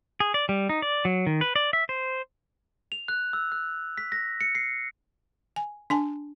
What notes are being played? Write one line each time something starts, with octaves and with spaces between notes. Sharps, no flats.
G#4
D5
G3
D#4
D5
F#3
D#3
B4
D5
E5
C5
F7
F#6
E6
F#6
B6
A#6
C#7
C7
G#5
D4 G#5 A5